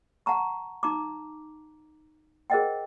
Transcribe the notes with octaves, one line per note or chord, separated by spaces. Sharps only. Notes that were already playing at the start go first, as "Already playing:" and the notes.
F#5 A5 A#5 C#6
D#4 A#5 D6
G#4 A#4 C5 D#5 F#5 G5